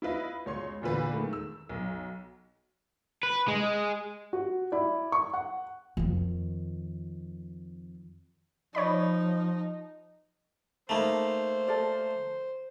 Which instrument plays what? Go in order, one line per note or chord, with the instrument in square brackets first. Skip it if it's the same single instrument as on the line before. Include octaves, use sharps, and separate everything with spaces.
[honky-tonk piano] E4 F4 B4 D#5
C#2 C#5 C6
E2 A#2 D3 B4
D#3 G#3 A3
E6
B1
[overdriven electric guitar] B4
G#3
[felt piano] F#4
E4 D5
C#6
F#5
[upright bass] F2 D#3
[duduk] F3 [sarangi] D#4 [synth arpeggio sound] C#5 D5 B5
[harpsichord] A3 A#3 [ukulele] D#4 A5 B5 [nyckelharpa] C5
[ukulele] A4 A#4 D5